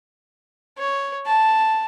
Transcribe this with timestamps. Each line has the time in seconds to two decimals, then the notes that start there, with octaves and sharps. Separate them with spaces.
0.78 C#5
1.26 A5